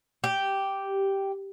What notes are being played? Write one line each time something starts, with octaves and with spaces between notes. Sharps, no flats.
G4